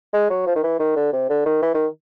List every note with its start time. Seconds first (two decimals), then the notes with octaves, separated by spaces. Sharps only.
0.13 G#3
0.30 F#3
0.46 F3
0.56 D#3
0.63 E3
0.79 D#3
0.96 D3
1.13 C3
1.29 D3
1.46 D#3
1.62 E3
1.74 D#3